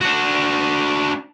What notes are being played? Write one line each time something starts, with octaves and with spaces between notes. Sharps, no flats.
D4 F#4